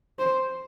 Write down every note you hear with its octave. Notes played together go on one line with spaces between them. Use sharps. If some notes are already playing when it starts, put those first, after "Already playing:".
C5